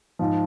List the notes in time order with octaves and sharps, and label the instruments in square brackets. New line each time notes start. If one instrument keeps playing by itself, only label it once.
[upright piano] G#2 F3